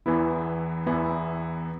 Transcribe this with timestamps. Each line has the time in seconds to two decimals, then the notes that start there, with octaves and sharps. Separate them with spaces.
0.06 E2 E3 B3 E4
0.86 E2 E3 B3 E4